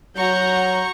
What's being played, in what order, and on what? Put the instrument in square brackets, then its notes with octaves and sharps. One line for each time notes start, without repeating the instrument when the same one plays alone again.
[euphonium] F#3 [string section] F#4 A#5 C#6 [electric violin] F#5 G6